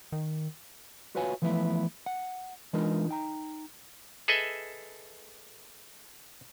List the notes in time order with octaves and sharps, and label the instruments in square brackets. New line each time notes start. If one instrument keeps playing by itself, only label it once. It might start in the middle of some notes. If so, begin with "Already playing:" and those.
[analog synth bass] D#3
[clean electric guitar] F4 F#4 B4 C#5 F5 G#5
E3 F3 A3 B3 E4
F#5
E3 G#3 D4 D#4 F4 A#4
D#4 G5 A#5
[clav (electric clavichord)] G#4 A4 B4 D#5 E5